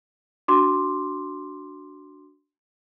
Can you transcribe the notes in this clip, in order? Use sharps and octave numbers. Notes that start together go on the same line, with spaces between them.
D4 F#4 C6 D6